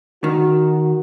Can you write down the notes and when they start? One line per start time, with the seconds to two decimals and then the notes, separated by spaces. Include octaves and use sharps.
0.24 D#3 F#4